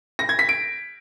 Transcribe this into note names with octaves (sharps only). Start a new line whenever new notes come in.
A#6
G#6
B6
D7